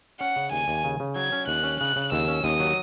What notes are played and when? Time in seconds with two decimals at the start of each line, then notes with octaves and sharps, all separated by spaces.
0.20 C#4 F#5
0.36 C#3
0.52 D#2 G#5
0.68 D#2
0.84 C#3
1.00 C#3
1.16 F#3 G#6
1.32 C#4
1.48 D#2 F#6
1.64 C#4
1.80 C#3 F#6
1.96 C#3
2.12 D#2 E6
2.28 C#4
2.44 D#2 D#6
2.60 F#3